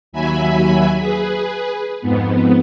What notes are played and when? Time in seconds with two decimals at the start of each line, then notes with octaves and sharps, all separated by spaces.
0.12 D#2 F#3 E5 G#5 B5
0.99 G#4 B4
2.02 F2 G#2 B3